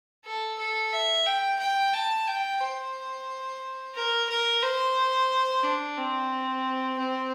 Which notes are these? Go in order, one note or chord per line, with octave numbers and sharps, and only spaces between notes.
A4
A4
E5
G5
G5
A5
G5
C5
A#4
A#4
C5
D4
C4
C4